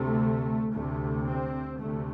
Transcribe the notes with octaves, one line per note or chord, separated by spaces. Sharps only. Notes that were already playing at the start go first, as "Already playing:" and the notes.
Already playing: D2 C3 A3
D2 C3 A3
C4
D2 C3 A3